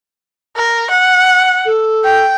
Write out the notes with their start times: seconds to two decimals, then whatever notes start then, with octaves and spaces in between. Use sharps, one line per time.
0.56 A#4
0.90 F#5
1.65 A4
2.04 G5